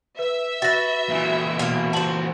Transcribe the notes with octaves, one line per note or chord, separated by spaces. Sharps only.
B4 E5
F#4 B4 A6 A#6
A#2 E3
B2 A#3 F5
F#4 C5 A5 F#7